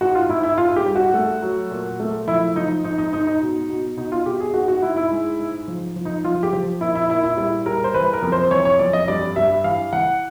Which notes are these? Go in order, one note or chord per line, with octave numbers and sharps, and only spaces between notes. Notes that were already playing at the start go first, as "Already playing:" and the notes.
G#2 F#4
F4
G#2 E4
E4
G#2 F4
G4
G3
F#4
A3
F#3
A#2
A3
F3 E4
F3 D#4
G#2 D#4
D#4
G#2 D#4
D#4
B2
B2
B2 D#4
F4
B2 G4
G#4
G#2 F#4
F#4
G#2 E4
E4
G#3
G#2
F3
F3
D#4
F3 F4
G4
F3
A#2 E4
E4
A#2 E4
E4
G3 E4
G3 A#4
C5
E3 B4
A#4
F2
C5
E3 C#5
C#5
F2 D5
D#5
G2 D5
G2 E5
E3 F5
E3 F#5